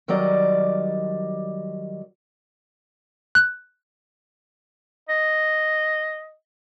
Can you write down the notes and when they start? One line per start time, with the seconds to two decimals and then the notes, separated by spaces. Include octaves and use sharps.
0.08 D#3 F#3 G3 A#4 D5 D#5
3.35 F#6
5.09 D#5